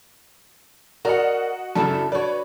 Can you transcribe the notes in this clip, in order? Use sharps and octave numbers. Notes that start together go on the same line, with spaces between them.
F#4 A#4 D5 D#5 F#5
F#2 C#3 D4 E4 A4
F#4 B4 C#5 D5